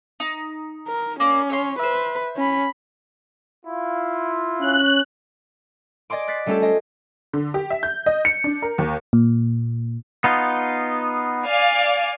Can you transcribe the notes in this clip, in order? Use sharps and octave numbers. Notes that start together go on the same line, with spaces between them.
D#4
A#4
A#3 C#4 D5
C#5 E5 C6
B4 C5 E5
C#4 B5
E4 F4
C#4 F#6
D5 D#5 G#5 C6 D6
F#6 A6 B6 C7
G3 A3 C#4 F4 G4 A4
G4 C5 D#5 G#5
D3
G4
E5
G6
D#5
C#7
D4
A#4
D#2
A#2
B3 D#4 F4
D5 F5 G#5